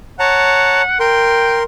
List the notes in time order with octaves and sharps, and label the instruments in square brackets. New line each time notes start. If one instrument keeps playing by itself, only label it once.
[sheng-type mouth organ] C#5 A5 A#5 [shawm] F#5
[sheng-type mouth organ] A#4 C6 [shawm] G5